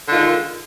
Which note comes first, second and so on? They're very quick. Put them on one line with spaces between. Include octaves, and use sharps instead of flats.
D3 D#3 F4 G#3